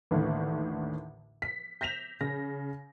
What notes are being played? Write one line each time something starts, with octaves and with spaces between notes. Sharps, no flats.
A1 D#2 A2 D3 D#3
B6
G6 A#6 B6 E7 F7
C#3 A#6